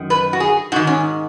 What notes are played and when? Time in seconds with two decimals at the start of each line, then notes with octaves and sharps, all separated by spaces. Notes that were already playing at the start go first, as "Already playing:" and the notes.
Already playing: F#2 D#3
0.10 B4
0.33 F#4
0.40 G#4
0.72 G#2 F#4
0.76 D#3
0.87 C#4